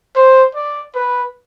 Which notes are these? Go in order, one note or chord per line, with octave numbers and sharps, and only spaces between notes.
C5
D5
B4